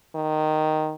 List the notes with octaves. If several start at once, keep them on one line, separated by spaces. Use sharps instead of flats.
D#3